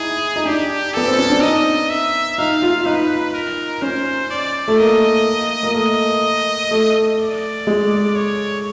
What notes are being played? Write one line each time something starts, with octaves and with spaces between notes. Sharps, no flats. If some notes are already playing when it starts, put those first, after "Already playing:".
Already playing: D#4 E4 G#4
D#4
D4 G4
B3 A4
C4
C#4
D4
D#4 D#5
E5
D#4 F5
F4
D#4 B4
A#4
C#4 C5
D5
A3
A#3 D#5
A#3
A3 D#5
A3
D5
G#3
C#5